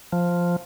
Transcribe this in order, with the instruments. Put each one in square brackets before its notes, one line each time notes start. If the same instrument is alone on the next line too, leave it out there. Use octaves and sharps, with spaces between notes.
[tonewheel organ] F3